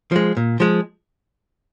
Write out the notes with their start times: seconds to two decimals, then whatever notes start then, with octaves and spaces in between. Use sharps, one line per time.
0.12 F3 G#3
0.37 A#2
0.60 F3 G#3